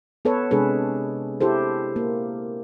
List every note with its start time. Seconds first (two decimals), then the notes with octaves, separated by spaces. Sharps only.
0.25 B3 A4 B4 C#5
0.51 C3 G#3 D4 G#4 A4 B4
1.41 E4 G4 A4 C5
1.96 A#3